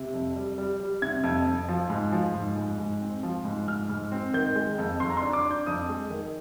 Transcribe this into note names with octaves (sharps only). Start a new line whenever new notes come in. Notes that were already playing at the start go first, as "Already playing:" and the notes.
Already playing: C3
F2
G3
G3
G3
C3 G#6
F2
F2
F3
G#2
F3
G#2
G#2
G#2
C4
F3
G#2
G#2 F6
G#2
C4
D#3 G6
G#3
F2
F2 C6
A#5
D4 C6
D6
D4
G6
F2 D#6
G#3
D#3